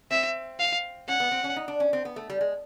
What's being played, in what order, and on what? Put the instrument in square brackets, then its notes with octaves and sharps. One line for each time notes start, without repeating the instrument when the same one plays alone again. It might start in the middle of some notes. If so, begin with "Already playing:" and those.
[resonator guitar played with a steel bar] C4 [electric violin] E5
[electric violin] F5
[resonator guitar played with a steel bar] C#4 [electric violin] F#5
[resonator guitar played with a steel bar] B3
C4
C#4
D#4
D4
C#4
C4
B3
A3
G3
G#3